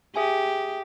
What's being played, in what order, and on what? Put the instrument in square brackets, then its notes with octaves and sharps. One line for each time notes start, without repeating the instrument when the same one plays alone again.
[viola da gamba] G4 [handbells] G#4 E5 G#5